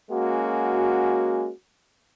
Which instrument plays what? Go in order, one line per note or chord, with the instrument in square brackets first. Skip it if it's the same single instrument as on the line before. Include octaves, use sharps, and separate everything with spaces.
[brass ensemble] G#3 A#3 C#4 F#4